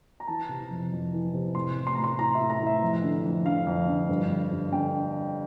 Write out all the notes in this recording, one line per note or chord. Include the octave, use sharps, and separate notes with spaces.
A#5
E3 A5
C3
F2
F2
E3
C3
A2 C6
E3
C6
A2 A#5
C6
E3 A#5
A2 E5
A#5
E3
E5
F2
D3
F2
D3 F5
F2
D3
G2
D3
G2
D3 G5